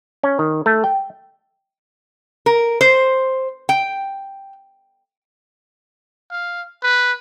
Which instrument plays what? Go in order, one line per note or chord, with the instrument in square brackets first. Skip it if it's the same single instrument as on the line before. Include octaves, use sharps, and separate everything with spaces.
[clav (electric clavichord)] C#4
D#3
A3
G5
[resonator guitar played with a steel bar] A#4
C5
G5
[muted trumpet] F5
B4